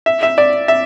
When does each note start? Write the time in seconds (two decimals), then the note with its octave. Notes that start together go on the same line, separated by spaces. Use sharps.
0.06 E5
0.23 E5
0.38 D5
0.68 E5